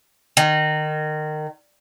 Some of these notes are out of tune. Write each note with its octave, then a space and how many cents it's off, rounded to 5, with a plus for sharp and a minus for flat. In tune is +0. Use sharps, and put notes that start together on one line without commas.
D#3 -25